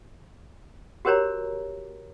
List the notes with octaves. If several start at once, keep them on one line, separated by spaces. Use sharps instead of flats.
F#4 G4 A#4 C5 C#5 A#5